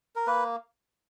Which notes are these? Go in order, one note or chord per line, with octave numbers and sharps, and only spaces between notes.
A#4
A#3 B4